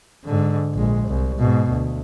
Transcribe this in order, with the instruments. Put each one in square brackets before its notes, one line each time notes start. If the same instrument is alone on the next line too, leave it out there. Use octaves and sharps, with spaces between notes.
[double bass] G#2 D3
A#1 G#3
C2
G#2 B2
D2